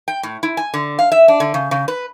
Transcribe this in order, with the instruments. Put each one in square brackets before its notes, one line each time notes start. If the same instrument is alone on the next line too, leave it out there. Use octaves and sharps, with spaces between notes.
[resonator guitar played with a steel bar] G5
A2
E4
G#5
D3
F5
E5
D4
D3
C#3
C#3
B4